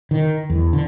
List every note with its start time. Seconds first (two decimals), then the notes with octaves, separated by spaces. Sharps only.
0.11 D#3
0.50 E2
0.73 D3